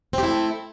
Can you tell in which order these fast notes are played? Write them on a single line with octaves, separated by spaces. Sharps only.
C4 G4 E4 A3